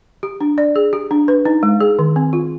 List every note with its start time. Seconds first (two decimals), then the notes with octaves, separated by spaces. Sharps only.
0.23 G4
0.41 D4
0.58 D5
0.76 G#4
0.93 G4
1.11 D4
1.28 B4
1.45 D#4
1.63 G#3
1.80 G#4
1.99 D#3
2.16 C4
2.33 F4